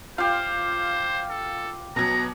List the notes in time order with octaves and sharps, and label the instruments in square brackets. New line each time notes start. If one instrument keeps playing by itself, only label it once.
[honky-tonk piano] F4 [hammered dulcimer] G4 F5 [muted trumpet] C5
[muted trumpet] A4
[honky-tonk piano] B2 F#3 [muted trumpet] A#5